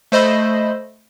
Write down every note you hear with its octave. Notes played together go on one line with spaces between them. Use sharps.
A3 C5 D#5 B5 E6